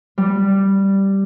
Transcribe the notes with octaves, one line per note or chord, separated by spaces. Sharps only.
G3